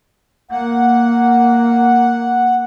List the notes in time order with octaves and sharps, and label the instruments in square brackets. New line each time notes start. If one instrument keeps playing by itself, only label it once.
[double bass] A#3 [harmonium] F#5